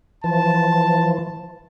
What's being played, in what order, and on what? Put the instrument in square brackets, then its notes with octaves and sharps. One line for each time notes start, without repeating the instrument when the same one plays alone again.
[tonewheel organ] E3 F3 [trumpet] A5